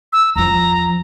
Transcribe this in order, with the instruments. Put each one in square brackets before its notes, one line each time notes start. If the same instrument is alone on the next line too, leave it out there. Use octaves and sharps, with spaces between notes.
[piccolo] E6
[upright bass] E2 F3 [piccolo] A#5